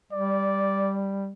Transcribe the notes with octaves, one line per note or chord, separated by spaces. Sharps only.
G3 D5